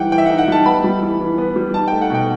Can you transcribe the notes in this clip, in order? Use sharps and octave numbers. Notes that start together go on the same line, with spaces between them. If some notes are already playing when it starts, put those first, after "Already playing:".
Already playing: E3 G3 D#4 F#5 G5
E3 G5
E5
F#5
D#4
F#5
G3 A5
B3 B5
G3
E3
E3
B3
G3
D#4 A5
G5
A3
F#5
B2 G5